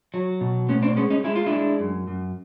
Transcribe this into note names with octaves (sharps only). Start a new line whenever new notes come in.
F#3
B2
A2 B3 C#4
C4 D4
G#3 B3 C#4
C#4 D#4
G#3 E4
F4
D4 E4
G#3
F#2
F#2